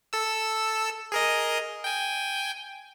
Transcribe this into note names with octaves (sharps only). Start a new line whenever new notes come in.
A4 E6
G#4 A#4 D#5
G5 G#5